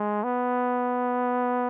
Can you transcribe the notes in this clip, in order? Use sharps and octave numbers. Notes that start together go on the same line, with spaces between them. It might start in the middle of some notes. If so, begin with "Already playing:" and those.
Already playing: G#3
B3